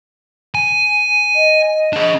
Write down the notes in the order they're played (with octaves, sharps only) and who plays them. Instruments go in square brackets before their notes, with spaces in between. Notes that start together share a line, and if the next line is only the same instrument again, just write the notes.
[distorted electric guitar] G#5
[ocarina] D#5
[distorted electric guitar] D4 G#4